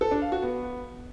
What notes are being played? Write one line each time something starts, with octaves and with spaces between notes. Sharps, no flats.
A4
D4
F5
F#4
B3